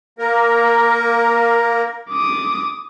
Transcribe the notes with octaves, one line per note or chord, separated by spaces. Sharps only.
A#3 A#4
D6 D#6